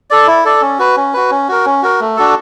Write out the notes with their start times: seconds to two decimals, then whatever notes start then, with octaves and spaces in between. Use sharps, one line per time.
0.10 A4 D5
0.27 E4
0.45 A4 D5
0.61 C#4
0.79 F#4 B4
0.97 C#4
1.13 F#4 B4
1.31 C#4
1.48 F#4 A#4
1.66 C#4
1.83 F#4 A#4
2.00 A3
2.17 D4 F#4 A4